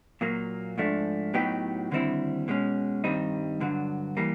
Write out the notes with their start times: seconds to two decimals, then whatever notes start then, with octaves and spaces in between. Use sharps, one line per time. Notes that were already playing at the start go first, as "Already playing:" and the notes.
0.21 A#2 F#3 A#3
0.78 G#2 F3 A3 D4
1.34 A2 F#3 B3 D#4 G4
1.91 D#2 D3 G3 C4 E4
2.48 B2 G#3 C#4
3.04 G2 D#3 G3 C4 D#4
3.60 G2 D3 F#3
4.17 E3 G3 A#3